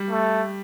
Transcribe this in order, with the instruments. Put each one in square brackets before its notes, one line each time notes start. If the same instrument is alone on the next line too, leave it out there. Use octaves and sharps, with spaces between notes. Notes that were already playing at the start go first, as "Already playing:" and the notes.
Already playing: [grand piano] G3
[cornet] A3